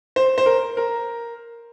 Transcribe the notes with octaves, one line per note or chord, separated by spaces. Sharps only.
C5
C5
A#4
A#4